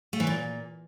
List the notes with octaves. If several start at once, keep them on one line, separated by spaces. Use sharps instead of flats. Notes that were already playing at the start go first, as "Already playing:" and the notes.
A3
E3
A#2